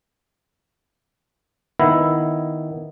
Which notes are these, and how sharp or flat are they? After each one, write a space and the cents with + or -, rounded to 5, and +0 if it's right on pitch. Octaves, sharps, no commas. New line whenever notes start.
D#3 +0 B3 +0 E4 +0